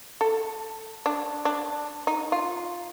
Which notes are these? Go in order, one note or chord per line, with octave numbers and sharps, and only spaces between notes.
A4
D4
D4
D#4
F4